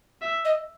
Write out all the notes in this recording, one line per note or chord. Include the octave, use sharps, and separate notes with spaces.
E5
D#5